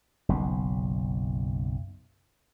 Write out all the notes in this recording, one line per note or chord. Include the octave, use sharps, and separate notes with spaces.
F#1 B1